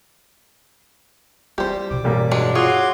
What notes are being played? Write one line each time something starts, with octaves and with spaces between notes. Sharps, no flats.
G3 E4 G4 C5
G2 B2 D6
A1 G3 A#3
F#3 G#3 D4
F4 F#4 G#4 C#5 C6 D6